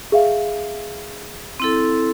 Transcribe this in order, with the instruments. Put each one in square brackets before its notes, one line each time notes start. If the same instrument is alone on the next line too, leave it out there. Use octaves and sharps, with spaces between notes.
[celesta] G#4 E5 F5
[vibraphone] C4 E4 A4